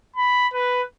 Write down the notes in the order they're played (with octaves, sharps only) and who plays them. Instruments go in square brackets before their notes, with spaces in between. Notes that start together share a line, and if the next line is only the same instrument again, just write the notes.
[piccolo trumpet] B5
B4